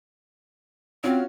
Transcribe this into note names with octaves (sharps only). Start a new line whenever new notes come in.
C4 C#4 F4 F#4